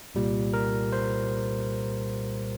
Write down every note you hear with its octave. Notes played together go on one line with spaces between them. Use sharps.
C2 A#2 G3
A#4
C5